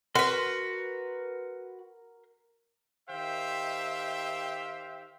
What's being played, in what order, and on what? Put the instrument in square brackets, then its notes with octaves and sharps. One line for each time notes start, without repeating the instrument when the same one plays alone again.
[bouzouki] F#4 B4 [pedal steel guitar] A#4 C6
[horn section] D#3 G4 C5 E5 F5 G5